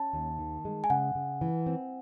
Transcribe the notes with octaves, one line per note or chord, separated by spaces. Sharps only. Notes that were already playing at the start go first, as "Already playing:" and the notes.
Already playing: C#4 A5
D#2
D#3
G#3
G#5
C#3 F#5
C#3
E3
C4